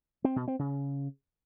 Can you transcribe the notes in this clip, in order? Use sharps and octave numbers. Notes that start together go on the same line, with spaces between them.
C4
B2
C4
C#3